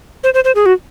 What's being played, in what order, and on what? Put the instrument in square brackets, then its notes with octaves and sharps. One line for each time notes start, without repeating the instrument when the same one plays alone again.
[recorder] C5
C5
C5
G#4
F#4